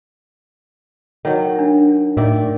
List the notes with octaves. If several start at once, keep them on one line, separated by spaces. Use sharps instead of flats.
D#3 F#3
D4
A2 D#3 D5 E5